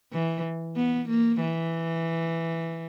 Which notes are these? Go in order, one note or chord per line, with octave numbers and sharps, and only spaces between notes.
E3
B3
A#3
E3